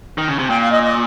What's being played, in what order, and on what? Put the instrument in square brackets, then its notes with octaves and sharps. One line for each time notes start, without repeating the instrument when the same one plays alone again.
[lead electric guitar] D#3
C#3
C3
[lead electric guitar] A#2 [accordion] G5
[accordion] F5
D#5
D#5